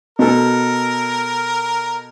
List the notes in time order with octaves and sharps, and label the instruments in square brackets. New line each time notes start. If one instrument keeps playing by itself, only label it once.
[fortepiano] B2 A4 [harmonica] A#4